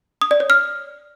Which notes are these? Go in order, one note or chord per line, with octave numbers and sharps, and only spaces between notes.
D#6
D5
C#5
F6